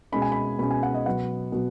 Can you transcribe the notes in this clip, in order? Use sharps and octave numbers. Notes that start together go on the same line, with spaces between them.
B2 G#3 C#4 B5
G#5
B5
B2 G#3 C#4 B5
G#5
F#5
D#5
B2 F#3 B3 F#5
B2 F#3 B3